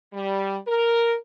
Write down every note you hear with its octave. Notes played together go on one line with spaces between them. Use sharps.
G3
A#4